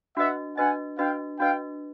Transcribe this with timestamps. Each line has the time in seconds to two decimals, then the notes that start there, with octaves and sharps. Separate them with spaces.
0.16 D4 F#4 B4 D#5 E5 F#5
0.57 D4 F#4 B4 D#5 F#5 G#5
0.98 D4 F#4 B4 D#5 F5 G5
1.39 D4 F#4 B4 D#5 F5 G5